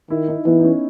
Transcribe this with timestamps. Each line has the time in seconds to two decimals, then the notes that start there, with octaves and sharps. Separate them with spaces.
0.10 D#3 E4
0.28 D#4
0.46 E3 B3
0.60 D#4
0.64 C#4